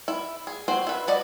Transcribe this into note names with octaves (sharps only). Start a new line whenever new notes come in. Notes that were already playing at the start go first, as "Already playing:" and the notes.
E4
G#4
C4 F#4 C5
E4 B4
F#4 B4 D5 D#5